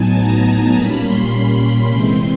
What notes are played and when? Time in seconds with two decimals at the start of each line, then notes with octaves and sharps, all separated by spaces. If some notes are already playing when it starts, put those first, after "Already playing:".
Already playing: A2 F#3 B3 D#4 G#5 A5
0.18 A#5
0.75 A#2 G3 A#3 C#4 B5
1.04 C6
1.31 C6
1.60 C6
1.88 C3 E3 G#3 C4